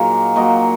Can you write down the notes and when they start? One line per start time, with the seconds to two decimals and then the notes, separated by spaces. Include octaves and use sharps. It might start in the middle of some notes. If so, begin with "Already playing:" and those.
Already playing: A#2 F#3 A#3 D#4 G#4 A#4
0.36 A#2 F#3 A#3 D#5